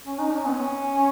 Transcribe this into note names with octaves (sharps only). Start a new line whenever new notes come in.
C#4
D#4
C#4
B3
C#4